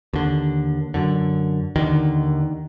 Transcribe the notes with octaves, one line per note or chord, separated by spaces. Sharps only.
D#2 D3
F#2 D3
D#2 D3 D#3